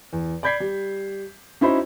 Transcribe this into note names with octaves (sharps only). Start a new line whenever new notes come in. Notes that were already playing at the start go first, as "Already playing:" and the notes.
E2
D5 B5 G6 G#6 B6 C7
G3
C#4 D#4 E4 F#4 C5 B5